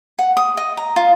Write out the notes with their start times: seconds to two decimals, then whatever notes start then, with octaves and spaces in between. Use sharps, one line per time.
0.19 F#5
0.37 D#6
0.57 D#5
0.77 A#5
0.96 F4